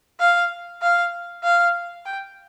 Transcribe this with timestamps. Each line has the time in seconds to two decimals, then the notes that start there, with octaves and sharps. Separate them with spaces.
0.20 F5
0.82 F5
1.44 F5
2.06 G5